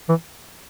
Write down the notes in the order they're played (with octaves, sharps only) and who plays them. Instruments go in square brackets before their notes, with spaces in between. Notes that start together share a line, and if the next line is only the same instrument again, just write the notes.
[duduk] E3